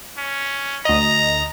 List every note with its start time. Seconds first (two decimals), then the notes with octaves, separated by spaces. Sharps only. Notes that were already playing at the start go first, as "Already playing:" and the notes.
0.18 C#4
0.85 D2 D#5 A#5